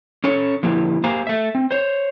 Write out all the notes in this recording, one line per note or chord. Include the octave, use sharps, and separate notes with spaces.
C#4 A4 C#5
D3 F3 A#3 E4 G4 B4
A#3 G4 C5 F5 G#5 A#5
A3 E5
C4
C5 C#5